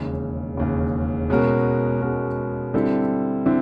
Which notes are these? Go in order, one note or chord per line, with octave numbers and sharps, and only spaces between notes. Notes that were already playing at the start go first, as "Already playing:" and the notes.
Already playing: E1 D#2 C#3
E1 D#2 C#3
B2 G#3 C#4 F#4 A#4
B2 G#3 C#4 F#4 A#4
D3 G3 C4 E4 A4
D3 C4 E4